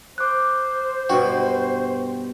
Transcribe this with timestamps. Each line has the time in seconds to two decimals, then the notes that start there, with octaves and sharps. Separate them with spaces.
0.18 C5 D6 F#6
1.10 G2 B2 F#4 G5